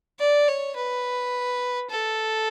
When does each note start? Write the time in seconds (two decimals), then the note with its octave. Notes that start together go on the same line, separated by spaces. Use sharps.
0.19 D5
0.48 C#5
0.76 B4
1.90 A4